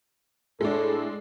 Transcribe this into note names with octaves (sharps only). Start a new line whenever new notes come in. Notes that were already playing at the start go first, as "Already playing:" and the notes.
A2 G#3 D4 A4